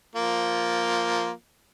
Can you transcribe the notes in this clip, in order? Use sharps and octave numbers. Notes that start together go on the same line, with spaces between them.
F3 A#3 F4